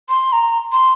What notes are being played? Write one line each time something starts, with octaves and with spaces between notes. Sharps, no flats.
C6
A#5
C6